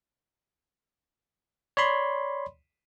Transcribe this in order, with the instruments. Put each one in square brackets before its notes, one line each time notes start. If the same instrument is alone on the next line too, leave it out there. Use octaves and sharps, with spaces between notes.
[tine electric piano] C#5 D5 B5 C6